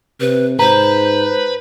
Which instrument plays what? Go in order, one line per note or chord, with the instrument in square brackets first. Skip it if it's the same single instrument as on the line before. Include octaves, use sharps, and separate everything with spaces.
[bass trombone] C3 [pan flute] B4
[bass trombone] G#2 [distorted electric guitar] B4 [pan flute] C5 [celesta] A#5